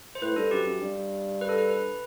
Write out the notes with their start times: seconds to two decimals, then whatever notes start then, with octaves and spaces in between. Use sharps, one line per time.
0.15 C5
0.22 A2 B4
0.36 G2 A4
0.51 F#2 G4
0.66 F#2
0.81 G2
1.41 B4
1.49 A4
1.58 B4
1.70 B4